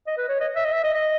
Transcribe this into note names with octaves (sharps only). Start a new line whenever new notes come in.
D#5
B4
C#5
D#5
E5
D#5
E5
D#5
D#5